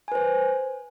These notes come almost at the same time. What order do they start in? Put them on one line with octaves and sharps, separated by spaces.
G#5 B4 C5